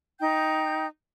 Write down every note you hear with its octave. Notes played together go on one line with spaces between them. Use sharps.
D#4 G5 G6